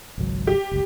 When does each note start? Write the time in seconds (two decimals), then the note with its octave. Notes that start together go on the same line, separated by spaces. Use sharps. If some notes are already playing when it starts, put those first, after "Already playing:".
0.18 G#1 C#2 F#3
0.47 G4
0.71 F#1 C#2